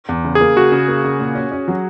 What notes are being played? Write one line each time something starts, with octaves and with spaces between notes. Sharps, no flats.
E2
C#3
G#4
A#3
C#3 F#4
C#3
A#3
C#3
A#2
C#4
C#4
F#3